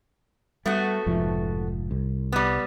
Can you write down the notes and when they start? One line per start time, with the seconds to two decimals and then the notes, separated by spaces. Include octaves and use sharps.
0.66 G3 A3 B3 F#4
1.06 F1 G#2 F3
1.91 C2
2.33 G3 B3